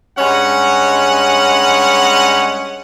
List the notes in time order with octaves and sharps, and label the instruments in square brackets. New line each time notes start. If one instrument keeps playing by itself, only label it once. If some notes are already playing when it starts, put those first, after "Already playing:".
[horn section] G2 G#3 C#4 F#5 G#5